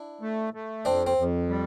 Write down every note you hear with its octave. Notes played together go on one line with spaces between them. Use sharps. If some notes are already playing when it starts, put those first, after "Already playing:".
Already playing: D4 E4
A3
A3
F2 C4 D4
C4
F2
G3